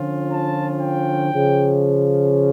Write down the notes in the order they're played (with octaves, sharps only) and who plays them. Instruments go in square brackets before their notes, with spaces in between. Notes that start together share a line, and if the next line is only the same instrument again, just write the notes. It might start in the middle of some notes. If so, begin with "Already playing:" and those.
Already playing: [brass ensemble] D3 F3 C#4 F4
A5
G5
C#3 F3 C#4